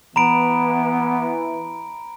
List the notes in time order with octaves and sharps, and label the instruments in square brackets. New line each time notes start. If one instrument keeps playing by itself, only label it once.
[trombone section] E3 [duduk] B3 [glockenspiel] A#5 B5 D7